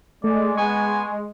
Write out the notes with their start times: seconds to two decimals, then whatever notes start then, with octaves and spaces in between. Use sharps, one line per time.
0.24 G#3 A3 D5
0.57 B3 G#5 C#6